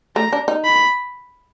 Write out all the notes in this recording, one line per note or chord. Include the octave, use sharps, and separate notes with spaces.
A3 A#5
D4
D#4
B5